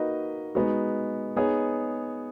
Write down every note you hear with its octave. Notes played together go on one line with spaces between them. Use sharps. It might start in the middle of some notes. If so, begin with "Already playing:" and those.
Already playing: A#3 D#4 F#4 B4 D#5
G#3 B3 D#4 F#4
B3 D#4 G#4 C#5